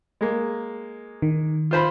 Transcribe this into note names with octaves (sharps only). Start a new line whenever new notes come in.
G#3 A#3
D#3
F4 C5 B5